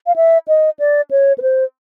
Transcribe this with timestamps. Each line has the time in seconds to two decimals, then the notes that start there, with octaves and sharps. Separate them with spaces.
0.07 F5
0.16 E5
0.48 D#5
0.79 D5
1.11 C#5
1.38 B4
1.42 C5